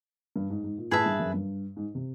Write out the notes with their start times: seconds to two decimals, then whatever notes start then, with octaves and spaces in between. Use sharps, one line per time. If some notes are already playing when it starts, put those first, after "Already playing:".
0.36 G2
0.50 G#2
0.64 G#2
0.78 A#2
0.91 A2 G#4 B4 E5 A5
1.06 G2
1.20 F#2
1.34 G2
1.77 G#2
1.95 C3